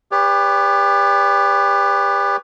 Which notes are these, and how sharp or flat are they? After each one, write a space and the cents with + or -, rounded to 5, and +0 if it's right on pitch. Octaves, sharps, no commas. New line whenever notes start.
G4 +30 B4 +0 D5 -45